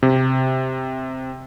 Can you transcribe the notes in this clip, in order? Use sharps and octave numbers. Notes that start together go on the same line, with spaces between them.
C3